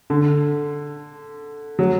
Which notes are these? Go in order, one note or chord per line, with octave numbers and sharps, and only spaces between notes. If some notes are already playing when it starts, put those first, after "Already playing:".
D3
F#3